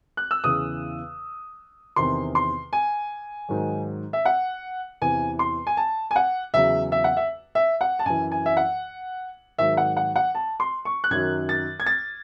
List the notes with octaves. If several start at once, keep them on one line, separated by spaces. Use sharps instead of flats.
F#6
E6
E2 C#3 E3 D#6
E2 C3 D#3 C6
C6
G#5
G#2 D#3 F#3
E5
F#5
E2 C3 E3 G#5
C6
G#5
A5
G#5
F#5
E2 C#3 F#3 E5
E5
F#5
E5
E5
F#5
A5
F#2 E3 G#5
G#5
E5
F#5
G#2 D#3 F#3 E5
F#5
F#5
F#5
A5
C6
C#6
F#6
F#2 D#3 F#3 G#6
A6
G#6
A6